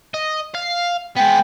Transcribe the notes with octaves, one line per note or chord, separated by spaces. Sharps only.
D#5
F5
G#3 B3 G5